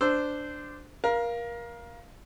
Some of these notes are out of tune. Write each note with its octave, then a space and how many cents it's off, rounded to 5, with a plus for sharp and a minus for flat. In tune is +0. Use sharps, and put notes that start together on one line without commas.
D4 +0 C5 -15 E6 +0
A#4 +25 F5 -5